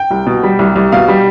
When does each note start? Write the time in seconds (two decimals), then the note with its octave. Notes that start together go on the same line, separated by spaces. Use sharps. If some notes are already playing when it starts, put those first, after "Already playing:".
Already playing: G5
0.11 C2
0.27 B2
0.43 G3
0.59 C2
0.76 C2
0.92 B2 F5
1.08 G3